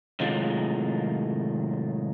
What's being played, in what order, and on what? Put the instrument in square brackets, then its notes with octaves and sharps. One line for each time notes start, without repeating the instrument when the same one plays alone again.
[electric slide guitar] A2 C3 D#3 F#3 G#3 F4